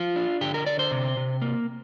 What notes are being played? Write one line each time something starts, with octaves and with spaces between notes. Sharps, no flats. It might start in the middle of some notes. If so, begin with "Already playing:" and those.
Already playing: F3 F4
D4
D3 G4
A#4
D3 D5
C5
C3
C3
A#3